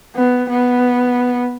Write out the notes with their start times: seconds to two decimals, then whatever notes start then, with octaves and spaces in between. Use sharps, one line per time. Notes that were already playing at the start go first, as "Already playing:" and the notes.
0.15 B3
0.49 B3